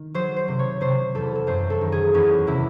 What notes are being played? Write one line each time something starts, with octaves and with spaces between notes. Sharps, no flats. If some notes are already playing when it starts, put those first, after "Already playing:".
Already playing: D#3
F#3 C5
C5
C3
C#5
C3 C5
E2 A4
A4
F#2 C5
A4
D#3
G#4
E2 C#4
C3 E4